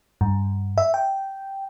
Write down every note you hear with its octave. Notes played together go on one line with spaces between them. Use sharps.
G2
E5
G5